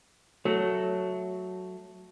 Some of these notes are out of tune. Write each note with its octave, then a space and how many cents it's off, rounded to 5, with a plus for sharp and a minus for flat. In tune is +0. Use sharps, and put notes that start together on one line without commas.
F#3 +0 A3 +0